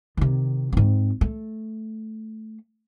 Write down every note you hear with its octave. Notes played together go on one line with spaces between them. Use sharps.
C3 D#3
G#2 C4
A3